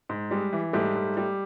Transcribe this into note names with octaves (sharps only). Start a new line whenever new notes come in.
G#2
G3 G#3
E3
G#2 G3 A3
G#2
G3